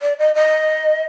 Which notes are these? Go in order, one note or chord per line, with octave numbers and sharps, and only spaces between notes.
D5
D#5
D#5